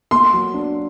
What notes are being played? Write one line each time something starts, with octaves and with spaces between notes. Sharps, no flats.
A#3 C6
F#3
D4